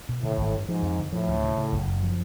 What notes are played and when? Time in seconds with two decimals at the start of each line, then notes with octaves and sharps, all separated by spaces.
0.09 B2
0.23 A2 D3
0.38 G#1
0.53 G2
0.68 G#2 F3
0.82 F2
0.98 D3
1.13 A2 F3
1.28 D2
1.43 C#3
1.57 C#3
1.72 F#1
1.88 F#2
2.03 F3